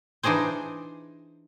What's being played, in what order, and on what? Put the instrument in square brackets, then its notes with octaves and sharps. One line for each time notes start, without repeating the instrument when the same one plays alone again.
[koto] E3 D4 D#4 G#4 C5